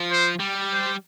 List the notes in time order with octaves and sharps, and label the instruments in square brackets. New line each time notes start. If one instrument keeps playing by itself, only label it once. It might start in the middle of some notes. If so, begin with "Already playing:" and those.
Already playing: [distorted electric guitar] F3
[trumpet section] C5
[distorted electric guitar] G3
[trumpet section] C5